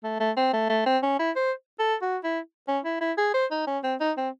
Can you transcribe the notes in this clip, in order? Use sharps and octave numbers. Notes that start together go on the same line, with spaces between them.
A3
A3
C4
A3
A3
C4
C#4
E4
C5
A4
F#4
E4
C#4
E4
E4
G#4
C5
D#4
C#4
C4
D#4
C4